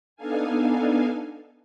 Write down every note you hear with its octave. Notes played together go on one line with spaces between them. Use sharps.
B3 D4 D#4 A4 F5 G#5